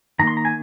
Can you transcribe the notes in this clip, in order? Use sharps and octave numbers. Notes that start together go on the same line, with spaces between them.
D#3 A#3 A#5
C6
A#5
G#5